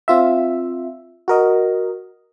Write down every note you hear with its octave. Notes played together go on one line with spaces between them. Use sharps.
C4 F4 E5
F#4 A#4 D#5